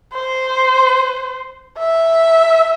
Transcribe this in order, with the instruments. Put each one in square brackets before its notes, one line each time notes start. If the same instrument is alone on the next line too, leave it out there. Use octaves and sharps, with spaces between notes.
[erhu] C5
E5